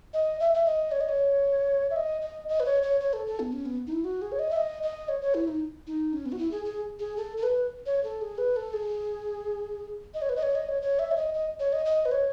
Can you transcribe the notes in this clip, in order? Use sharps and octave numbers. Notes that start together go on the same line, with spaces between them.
D#5
E5
E5
D#5
C#5
D#5
C#5
E5
D#5
D#5
D#5
B4
C#5
C#5
C#5
A4
A4
B3
C#4
B3
D#4
E4
F#4
G#4
C#5
D#5
E5
D#5
D#5
C#5
C#5
E4
D#4
D#4
C#4
B3
F#4
E4
G#4
G#4
G#4
A4
A4
B4
C#5
A4
G#4
B4
A4
G#4
D#5
C#5
B4
D#5
C#5
D#5
C#5
C#5
E5
C#5
D#5
D#5
C#5
D#5
D#5
B4
C#5